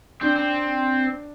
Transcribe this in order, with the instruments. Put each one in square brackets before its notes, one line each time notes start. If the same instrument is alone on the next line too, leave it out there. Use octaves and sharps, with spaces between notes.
[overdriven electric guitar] C4 [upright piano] D4
[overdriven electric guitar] C4